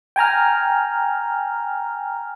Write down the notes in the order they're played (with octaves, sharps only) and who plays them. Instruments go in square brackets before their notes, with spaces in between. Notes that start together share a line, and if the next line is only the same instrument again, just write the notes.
[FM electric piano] G5 G#5 A#5 F6